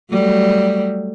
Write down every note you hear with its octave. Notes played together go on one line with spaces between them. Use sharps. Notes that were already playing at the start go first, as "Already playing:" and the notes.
F#3 G3 A3